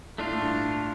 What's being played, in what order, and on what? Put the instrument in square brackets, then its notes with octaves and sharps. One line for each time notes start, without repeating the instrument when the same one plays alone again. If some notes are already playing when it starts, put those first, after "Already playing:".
[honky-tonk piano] A2 [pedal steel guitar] A3 D4 F4
[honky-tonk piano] A2
G2